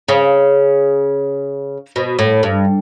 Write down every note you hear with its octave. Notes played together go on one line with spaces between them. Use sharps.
C#3
B2
A2
G2